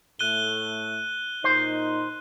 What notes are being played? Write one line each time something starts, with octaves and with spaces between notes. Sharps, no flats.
A2 A3 F#6 D#7 G7
A#2 D#4 C5